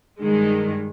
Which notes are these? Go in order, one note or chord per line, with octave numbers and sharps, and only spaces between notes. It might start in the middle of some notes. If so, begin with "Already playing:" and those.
G2 D#3 G#3